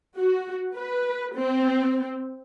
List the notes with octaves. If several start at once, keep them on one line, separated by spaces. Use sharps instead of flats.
F#4
B4
C4